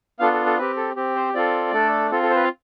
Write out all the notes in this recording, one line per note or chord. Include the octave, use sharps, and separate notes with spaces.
B3 D4 F4 A4 F5
A4
A4
C4 G4 B4
A4
C4 G4
C5
C4 F4 A4 D5
A3 D4 A4
C4 F4 A4
A4
C5
B4
F5